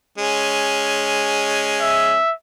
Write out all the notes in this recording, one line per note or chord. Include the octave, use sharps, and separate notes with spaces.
G#3 C#4
E5